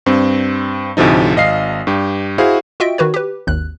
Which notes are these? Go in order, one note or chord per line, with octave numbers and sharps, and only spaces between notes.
G2 C4
D2 A2 C3 F3 D#4
G#1 D#5 F5 C7
G2 G4
E4 F#4 G#4 C5 F5
F4 F#4 D#5 E5 G5 D7
D#3 F#4 B4 C#5
G4 B4
G#1 D#2 F#6